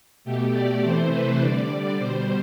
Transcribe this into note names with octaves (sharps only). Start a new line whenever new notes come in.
B2 A3 G4
D5
C3 E3 A3 C5
B4
D3 G3 D5
B2 G3 C5